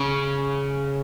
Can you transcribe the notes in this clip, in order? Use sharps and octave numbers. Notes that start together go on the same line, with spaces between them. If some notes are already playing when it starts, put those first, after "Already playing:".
Already playing: C#3